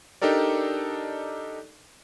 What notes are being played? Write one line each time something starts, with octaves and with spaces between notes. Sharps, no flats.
D4 D#4 G4 A4 A#4 D5